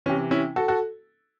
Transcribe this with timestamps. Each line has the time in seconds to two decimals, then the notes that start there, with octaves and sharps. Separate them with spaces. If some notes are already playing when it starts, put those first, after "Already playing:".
0.06 C3 E3 C#4
0.31 C#4 E4
0.56 F#4 A4
0.68 F#4 A4